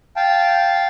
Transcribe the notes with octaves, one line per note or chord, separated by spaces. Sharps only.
F5 G5 A5